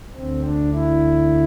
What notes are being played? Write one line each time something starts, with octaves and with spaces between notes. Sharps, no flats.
D2 D3 C4
D4
E4